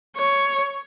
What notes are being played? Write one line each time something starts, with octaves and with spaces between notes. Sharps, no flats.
C#5